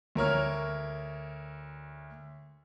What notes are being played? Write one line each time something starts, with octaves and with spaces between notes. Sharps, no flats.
D2 A#4 C#5 F6